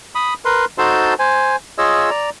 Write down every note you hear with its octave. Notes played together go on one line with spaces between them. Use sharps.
B5 D#6
A#4 B4 C6
D#4 F#4 A4 C5 A5 C6
C5 G#5
F4 G#4 C#5 D#5 E6
D5 A#5